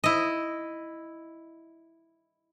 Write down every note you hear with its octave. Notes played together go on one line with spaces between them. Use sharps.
E4 D#5